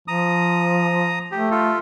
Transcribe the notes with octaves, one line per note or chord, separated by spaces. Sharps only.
F3 A#5 D#6
A3 G4
F4 A4